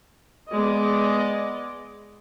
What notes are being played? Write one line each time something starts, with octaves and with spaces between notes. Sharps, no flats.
G#3 B3 D5 D#5